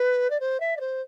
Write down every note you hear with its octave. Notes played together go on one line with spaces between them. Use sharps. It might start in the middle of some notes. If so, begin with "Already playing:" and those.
Already playing: B4
D5
C5
E5
D5
C5